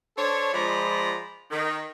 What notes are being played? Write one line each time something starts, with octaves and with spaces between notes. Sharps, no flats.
D4 A4 C5 C#5
F3 G#3 F4 D5 A#5 B5
D#3